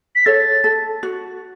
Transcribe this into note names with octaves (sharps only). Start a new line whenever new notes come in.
B6
A4 C#5 A6
A4
F#4